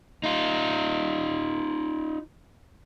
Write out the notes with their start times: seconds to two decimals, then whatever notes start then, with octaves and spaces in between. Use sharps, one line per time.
0.24 D#4 F4